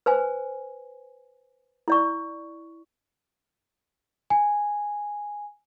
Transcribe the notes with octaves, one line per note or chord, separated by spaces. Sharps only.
B4 C5 G#5
E4 D5 C#6
G#5